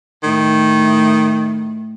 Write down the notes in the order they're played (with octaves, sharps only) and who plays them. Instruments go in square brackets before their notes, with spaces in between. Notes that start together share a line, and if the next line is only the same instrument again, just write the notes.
[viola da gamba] A2 [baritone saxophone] D#3